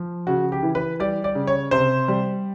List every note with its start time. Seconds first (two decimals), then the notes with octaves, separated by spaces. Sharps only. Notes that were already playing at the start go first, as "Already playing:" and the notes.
Already playing: F3
0.27 C#3 F#4
0.52 G4
0.63 E3
0.75 B4
1.00 G3 D5
1.24 D5
1.35 C#3
1.47 C#5
1.71 C3 C5
2.08 G3